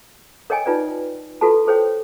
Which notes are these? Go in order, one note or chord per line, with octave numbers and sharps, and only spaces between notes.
A#4 C#5 D#5 G5 G#5
D#4 F4 B4 D5
F4 F#4 A4 B4 A5
A4 C5 C#5 G5